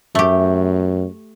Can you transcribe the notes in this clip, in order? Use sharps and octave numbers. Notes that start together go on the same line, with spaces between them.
F#2 A3 G4